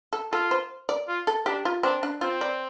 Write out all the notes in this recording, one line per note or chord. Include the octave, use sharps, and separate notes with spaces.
A4
F4 A4
C5
D5
F4
A4
D4 G4
F4
C4 D4
D4
C4 F4
D5